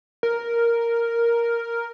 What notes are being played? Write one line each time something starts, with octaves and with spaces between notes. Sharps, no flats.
A#4